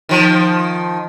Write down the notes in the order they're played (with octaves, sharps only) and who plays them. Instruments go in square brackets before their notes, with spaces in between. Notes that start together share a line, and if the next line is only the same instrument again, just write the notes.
[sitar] D#3 F3